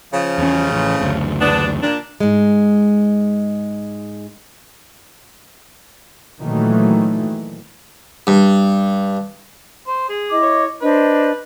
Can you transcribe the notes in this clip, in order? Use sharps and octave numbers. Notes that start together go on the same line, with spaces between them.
C#3 F3
E2 C#4
A1
F#1 D2
E2 B3 D4
A#2 D4
G#2 G#3
A#2 D#3 E3 F#3 A3
G2
C5
G#4
E4 D#5 D6
C#5
D4 B4 C5 D#5